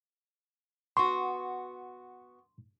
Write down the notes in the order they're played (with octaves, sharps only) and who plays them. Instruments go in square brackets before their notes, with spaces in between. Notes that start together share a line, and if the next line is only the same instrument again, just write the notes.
[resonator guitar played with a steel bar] B3 F#4 [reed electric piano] C6 [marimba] C#6